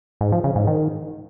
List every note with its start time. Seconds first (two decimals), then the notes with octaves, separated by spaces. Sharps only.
0.21 G#2
0.32 F3
0.44 C#3
0.56 G#2
0.67 D#3